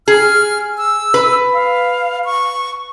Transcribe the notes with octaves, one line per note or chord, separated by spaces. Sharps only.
G#4 F6
E6
B4
F5
C#6